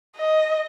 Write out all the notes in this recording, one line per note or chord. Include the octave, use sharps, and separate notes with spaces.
D#5